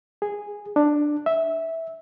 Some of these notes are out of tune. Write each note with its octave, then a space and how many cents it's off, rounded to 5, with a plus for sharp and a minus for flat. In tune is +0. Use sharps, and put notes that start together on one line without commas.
G#4 -10
D4 +10
E5 -10